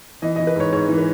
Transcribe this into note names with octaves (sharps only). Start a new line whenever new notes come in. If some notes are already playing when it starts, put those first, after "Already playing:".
E3 D#5
D#5
E3
B4
G#2 C#5
G#2 C#5
E3
B4